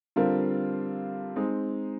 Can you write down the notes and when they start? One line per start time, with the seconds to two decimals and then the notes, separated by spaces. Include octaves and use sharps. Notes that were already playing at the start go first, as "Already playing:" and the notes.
0.16 D3 G3 C4 F4 A#4
1.36 G#3 C4 D#4